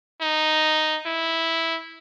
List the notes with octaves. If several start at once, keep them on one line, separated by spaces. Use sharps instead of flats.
D#4
E4